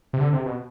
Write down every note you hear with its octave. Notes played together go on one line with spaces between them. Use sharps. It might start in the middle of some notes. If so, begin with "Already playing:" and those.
C3
D3
C3
B2